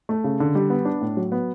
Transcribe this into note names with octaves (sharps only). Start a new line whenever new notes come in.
A3
C#3
D3
G3
B3
D4
A2
F#3
B3